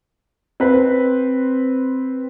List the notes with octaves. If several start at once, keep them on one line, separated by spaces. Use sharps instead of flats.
C4 B4